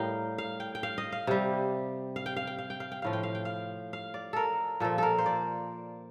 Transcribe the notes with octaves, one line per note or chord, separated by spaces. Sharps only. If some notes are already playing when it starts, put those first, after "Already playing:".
Already playing: A2 G3 A#4 D#5 F5 G5
F5
G5
G5
F5
D#5
F5
C3 G3
F5
G5
F5
G5
F5
G5
F5
G5
A2 F3 F5
G5
F5
G5
F5
F5
D5
A4 A#4
A#2 F3 A4
A4 A#4
C5
D5